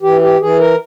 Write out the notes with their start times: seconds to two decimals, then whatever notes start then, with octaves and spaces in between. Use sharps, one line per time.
0.02 E3 G4
0.21 G4
0.40 E3 G#4
0.59 A#4